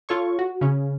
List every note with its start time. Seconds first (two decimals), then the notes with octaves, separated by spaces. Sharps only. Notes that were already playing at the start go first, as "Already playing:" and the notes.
0.09 F4 A4 C#5 C#6
0.39 F#4
0.61 C#3 C#4